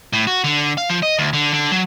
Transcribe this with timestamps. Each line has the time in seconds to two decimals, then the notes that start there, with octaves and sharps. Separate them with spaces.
0.13 A2
0.27 F#4
0.44 D3
0.77 F5
0.90 F3
1.02 D#5
1.19 D2
1.33 D3
1.53 D3
1.72 F#3